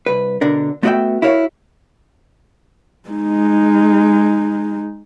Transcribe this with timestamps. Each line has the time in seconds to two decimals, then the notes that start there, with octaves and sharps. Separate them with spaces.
0.06 C2 B4
0.41 B2 D3 D4 A#4
0.83 A3 B3 F#4 D5 E5 G5
1.22 E4 F#4 A#4 C#5 E5 F5
3.09 G#3 D#4